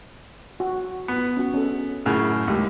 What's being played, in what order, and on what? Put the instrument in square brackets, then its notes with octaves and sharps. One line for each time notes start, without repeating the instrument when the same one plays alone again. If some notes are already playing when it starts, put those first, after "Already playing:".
[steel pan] F#4
[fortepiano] B3
[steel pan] C#4 F#4
C#4 A4
[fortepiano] F#2 A2 C#3
[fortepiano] D#2 A2 [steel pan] G#3 G4